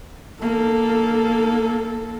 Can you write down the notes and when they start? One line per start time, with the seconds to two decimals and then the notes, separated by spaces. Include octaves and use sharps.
0.42 A#3 A4